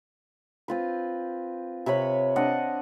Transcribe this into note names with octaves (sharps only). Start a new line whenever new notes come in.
C4 F4 B4
C3 B4 C#5 B5
C4 D4 D#5 F#5